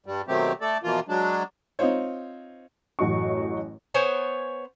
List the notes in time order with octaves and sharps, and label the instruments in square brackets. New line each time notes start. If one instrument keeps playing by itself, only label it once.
[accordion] G2 G3
B2 D#3 F#3 A3 C4 G4
A3 A4 D5
B2 E3 F3 A#3 F4
F#3 G#3 D4
[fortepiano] C4 D#4 F4 C5 C#5
[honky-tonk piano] A1 F#2 A3 F#4 D#5 C#6
[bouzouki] B3 C5 C#5 G#5